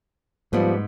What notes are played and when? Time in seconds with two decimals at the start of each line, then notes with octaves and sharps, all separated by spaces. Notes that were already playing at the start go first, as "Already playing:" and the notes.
0.53 G#2 F3 G3 B3